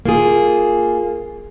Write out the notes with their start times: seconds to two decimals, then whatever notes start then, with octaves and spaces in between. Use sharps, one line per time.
0.05 A#3 F4 G#4